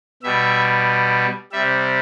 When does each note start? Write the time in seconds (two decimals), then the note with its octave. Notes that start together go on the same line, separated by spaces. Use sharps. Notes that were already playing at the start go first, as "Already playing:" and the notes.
0.23 B2 G3 E5
1.52 C3 G3 E5